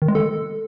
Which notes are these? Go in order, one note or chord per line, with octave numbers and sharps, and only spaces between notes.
D#3
G#3
A4